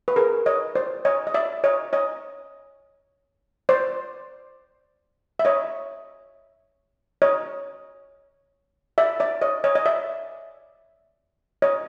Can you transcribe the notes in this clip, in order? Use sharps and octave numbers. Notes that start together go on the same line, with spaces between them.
B4
G#4 A#4
C#5 D#5
C5 D5
C#5 D#5
D#5
D5 E5
C#5 D#5
C#5 D#5
C5 D5
E5
C#5 D#5
C#5 D#5
D5 E5
D5 E5
C#5 D#5
C#5 D#5
D#5
D5 E5
C#5 D#5